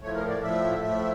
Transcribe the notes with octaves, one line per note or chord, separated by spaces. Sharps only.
A2 F3 A3 C#5
A#4
D5
A2 F3 A3 E5
A2 F3 A3 E5